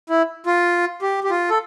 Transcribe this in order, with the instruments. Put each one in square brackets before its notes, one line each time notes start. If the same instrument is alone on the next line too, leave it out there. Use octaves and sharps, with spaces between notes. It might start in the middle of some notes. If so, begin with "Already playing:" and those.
[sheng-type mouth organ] E4
F4
G4
G4
F4
A4